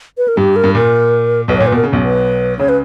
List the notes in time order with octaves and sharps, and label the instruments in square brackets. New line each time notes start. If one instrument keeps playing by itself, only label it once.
[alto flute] B4
A#4
[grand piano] G2 [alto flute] G4
[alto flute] A#4
[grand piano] G2
[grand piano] A#2 [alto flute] A#4
[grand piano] B1 B2 [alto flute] B4
[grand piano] A#2 [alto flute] C#5
[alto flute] B4
[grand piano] B2 [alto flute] A#4
[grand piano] C#3
B1 B2
[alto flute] B4
[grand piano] C#2 C#3 [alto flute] C#5
[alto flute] B4